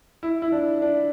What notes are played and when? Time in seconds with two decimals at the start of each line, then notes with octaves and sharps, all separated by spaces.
0.23 E4
0.42 E4
0.52 D4
0.82 D4